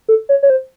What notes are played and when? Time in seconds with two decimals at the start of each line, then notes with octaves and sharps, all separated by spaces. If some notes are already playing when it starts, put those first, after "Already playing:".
0.08 A4
0.29 C#5
0.43 C#5
0.50 C5